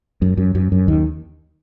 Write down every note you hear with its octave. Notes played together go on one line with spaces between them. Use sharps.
F#2
F#2
F#2
F#2
D#2 D#3